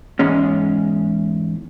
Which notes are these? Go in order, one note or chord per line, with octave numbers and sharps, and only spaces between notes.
E2 G#2 G#3 C#4